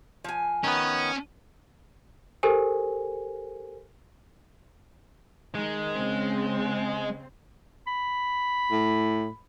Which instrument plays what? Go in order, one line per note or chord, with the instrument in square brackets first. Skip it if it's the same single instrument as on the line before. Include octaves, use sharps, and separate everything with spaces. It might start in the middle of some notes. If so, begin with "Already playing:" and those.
[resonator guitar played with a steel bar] F3 G#5
[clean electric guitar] D#3 B3 [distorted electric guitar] C#4
[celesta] G4 A4 A#4 C5 G#5
[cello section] D#3 [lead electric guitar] G#3
[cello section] C#3 C4
[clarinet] B5
[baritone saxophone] A2